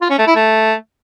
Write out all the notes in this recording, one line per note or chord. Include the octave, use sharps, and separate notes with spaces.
F4
C#4
A3
E4
A3